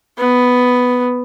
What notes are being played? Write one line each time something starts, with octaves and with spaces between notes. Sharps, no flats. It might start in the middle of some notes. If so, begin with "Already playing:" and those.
B3